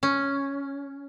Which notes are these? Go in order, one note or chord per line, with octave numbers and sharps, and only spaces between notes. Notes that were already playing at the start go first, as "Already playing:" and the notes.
C#4